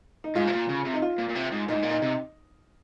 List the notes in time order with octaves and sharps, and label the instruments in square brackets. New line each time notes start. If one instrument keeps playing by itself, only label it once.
[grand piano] D#4
[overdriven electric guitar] G#2 [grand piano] F4
[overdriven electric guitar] C3
A#2
C#3
C3
[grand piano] D#4
F4
[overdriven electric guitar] A#2
A#2
C3
G#2
[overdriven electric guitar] A#2 [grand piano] D#4
[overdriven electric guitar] G#2
A#2
[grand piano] D#4
[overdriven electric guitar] C3